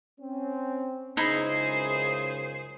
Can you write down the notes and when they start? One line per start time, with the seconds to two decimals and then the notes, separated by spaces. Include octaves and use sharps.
0.20 C4 C#4
1.17 C#2 F#2 C#3 D#4 E4 G#4 C5